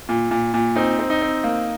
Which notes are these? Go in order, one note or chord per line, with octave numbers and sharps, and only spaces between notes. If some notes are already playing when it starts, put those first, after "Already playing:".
A#2
A#2
A#2
C4 D#4
C4
D#4
C4
A#3